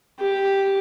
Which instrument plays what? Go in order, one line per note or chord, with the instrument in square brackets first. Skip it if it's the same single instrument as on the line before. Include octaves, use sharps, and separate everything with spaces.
[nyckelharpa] G4